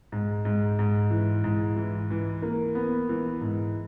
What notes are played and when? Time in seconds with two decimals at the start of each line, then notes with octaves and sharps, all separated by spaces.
0.12 G#2
0.45 G#2
0.79 G#2
1.11 E3
1.44 G#2
1.76 E3
2.11 E3
2.42 A#3
2.75 B3
3.09 E3
3.41 G#2